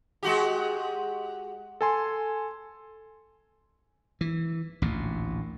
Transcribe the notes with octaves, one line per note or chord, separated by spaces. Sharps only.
G#3 F#4 G4
A4 G#5 C6
E3
A1 D2 A#2